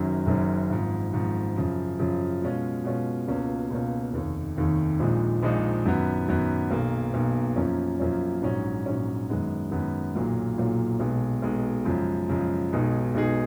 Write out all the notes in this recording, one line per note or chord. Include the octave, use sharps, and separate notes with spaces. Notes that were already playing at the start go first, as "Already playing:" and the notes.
Already playing: F#1 F#2 D#3 F#3
F#1 F#2 D#3 F#3
G#1 G#2 F3
G#1 G#2 F3
F#2 C#3 F3
F#2 C#3 F3
B2 G#3 C#4 F4
B2 G#3 C#4 F4
C#2 B2 A#3 C#4 F4
C#2 B2 A#3 C#4 F4
F1 D#2 D#3
F1 D#2 D#3
A#1 A#2 F3 G#3 D#4
A#1 A#2 F3 G#3 D#4
F#2 D#3 F#3 B3
F#2 D#3 F#3 B3
B1 B2 A#3
B1 B2 A#3
F#2 F3 A#3 C#4
F#2 F3 A#3 C#4
A#1 G#2 F#3 C#4
A#1 G#2 F#3 C#4
F#2 D#3 G#3 B3
F#2 D#3 G#3 B3
B1 A#2 F#3 A#3
B1 A#2 F#3 A#3
B1 B2 G#3
B1 B2 G#3
F#2 C#3 F3 G#3
F#2 C#3 F3 G#3
B1 B2 G#3 D#4 G#4
B1 B2 G#3 D#4 G#4